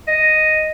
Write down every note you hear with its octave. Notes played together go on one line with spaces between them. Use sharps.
D#5